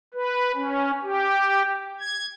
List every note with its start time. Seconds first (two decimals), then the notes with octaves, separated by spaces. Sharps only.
0.14 B4
0.55 C#4
1.03 G4
2.00 G#6